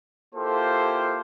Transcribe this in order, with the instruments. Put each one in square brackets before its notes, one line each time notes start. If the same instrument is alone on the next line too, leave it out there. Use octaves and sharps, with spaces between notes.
[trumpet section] A#3 E4 F4 G4 A4 C5